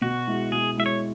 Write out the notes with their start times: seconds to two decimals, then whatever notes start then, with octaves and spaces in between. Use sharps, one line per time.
0.01 B2 F#4
0.27 G#3 E4
0.52 B2 G#4
0.77 G#3 E4 E5
0.86 C#5